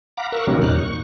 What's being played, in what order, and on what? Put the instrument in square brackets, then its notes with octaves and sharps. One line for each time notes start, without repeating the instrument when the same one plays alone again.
[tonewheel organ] F5 F#5 A#5 B5 D6
A#4 F5 C#6 E6 F#6
C3 D#3 F#3 G3 A#3 C#4
E2 A#2 D#4 F6 F#6
C#6